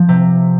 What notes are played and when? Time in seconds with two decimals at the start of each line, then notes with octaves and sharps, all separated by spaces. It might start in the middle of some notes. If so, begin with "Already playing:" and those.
Already playing: F3
0.09 C3